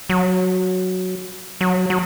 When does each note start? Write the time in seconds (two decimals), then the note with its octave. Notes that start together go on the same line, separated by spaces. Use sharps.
0.10 F#3
1.61 F#3
1.90 F#3